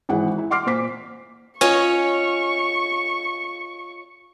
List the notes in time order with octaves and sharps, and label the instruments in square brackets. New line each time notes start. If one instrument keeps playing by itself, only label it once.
[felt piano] G#1 E3 G#4 F#5
E4
F#5 C6 D6 F6 C7
A#2 C5 D6 B6
[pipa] C#4 [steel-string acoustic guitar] F4 C#5 D#5 [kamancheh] C#6